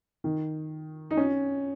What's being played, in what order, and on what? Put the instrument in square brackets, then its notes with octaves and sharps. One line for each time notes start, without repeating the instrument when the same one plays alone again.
[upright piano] D#3
D#4
C#4